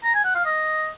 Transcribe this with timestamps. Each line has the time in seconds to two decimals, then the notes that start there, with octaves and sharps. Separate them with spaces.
0.04 A#5
0.14 G#5
0.25 F#5
0.35 F5
0.45 D#5